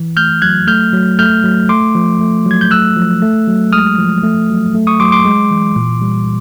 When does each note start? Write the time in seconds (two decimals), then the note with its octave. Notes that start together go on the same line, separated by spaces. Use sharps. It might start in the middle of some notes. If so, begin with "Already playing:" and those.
Already playing: E3
0.17 A3 F6 G6
0.42 F#3 F#6 G#6
0.67 A3 F6 G6
0.93 F#3
1.19 A3 F6 G6
1.44 F#3
1.69 A3 C6 D6
1.95 F3
2.21 A3
2.46 F#3
2.51 G#6
2.61 G6
2.71 A3 E6 F#6
2.97 F3
3.22 A3
3.47 F#3
3.73 G#3 D#6 F6
3.98 F3
4.23 A3
4.49 F#3
4.75 A3
4.87 C#6 D#6
5.00 F#3 C6 D6
5.12 C6 D6
5.25 G#3
5.51 E3
5.76 A#2
6.02 G3